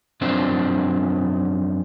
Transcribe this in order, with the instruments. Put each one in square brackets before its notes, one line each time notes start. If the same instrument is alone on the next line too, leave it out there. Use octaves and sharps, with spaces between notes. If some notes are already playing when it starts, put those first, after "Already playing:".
[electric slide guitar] F#2 F3 C4 D4 C5